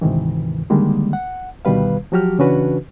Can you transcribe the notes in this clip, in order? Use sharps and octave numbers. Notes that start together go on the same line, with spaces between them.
D2 G#2 C3 D#3 E3
D3 D#3 G3 G#3 A#3
F#5
D2 B2 D#3 G3 B4 F5
F3 F#3 F#4 G4 F6
C#3 E3 C#4 D4 F#4 B4